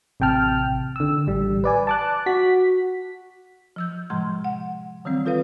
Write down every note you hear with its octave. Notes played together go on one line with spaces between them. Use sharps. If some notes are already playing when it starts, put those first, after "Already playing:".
A1 C3 G5 A5 F6
D3 E6
A1 G3
B4 D5 G#5
A5 D6 F#6
F#4 B6
F3 E6 G6
A2 C3 F3 G#3 C6
F#5
D#3 E3 G3 C4
F4 A4 B4 F5